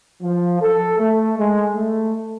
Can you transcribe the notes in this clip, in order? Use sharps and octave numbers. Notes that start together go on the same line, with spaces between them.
F3
A4
A3
G#3
A3